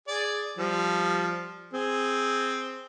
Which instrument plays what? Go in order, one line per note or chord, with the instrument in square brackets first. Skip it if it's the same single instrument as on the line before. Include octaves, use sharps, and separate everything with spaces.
[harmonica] G#4 D5
F3 G3
C4 G#4